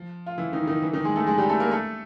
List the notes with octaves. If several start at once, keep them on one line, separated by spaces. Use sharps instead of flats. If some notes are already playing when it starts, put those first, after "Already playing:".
Already playing: F3
F4
E3 E4
D#3 D#4
E4
D#3 D#4
E3 E4
D#3 D#4
G#3 G#4
A3 A4
G#3 G#4
G3 G4
A3 A4
A#3 A#4
A3 A4